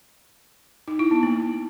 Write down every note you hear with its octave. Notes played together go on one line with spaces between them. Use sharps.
D#4
E4
B3
A#3